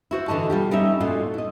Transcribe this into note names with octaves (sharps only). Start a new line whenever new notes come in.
E4 F#4 C5
D3 E3 D#5 A5
B2 G3 F4 G4
G3 C#4 D#4 C#5 D#5 E5
A#2 F4 F#4 A4 D#5
E4 D#5